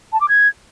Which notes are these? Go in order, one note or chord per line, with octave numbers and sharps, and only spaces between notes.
A5
D6
G#6